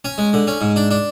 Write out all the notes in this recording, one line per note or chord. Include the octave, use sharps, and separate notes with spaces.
C#4
G#3
D3
C#4
G#2
D4
D4